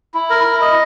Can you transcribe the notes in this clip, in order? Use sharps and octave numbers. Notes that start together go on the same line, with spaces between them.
E4
A#4
E4
D#5